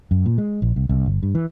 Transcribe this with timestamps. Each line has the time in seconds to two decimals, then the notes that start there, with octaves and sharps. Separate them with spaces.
0.11 F#2
0.26 A#2
0.38 G#3
0.62 A#1
0.76 C2
0.89 C2
1.06 G1
1.23 G2
1.35 E3